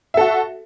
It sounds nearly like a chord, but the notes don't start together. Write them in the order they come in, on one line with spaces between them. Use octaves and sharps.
E5 A4 F#4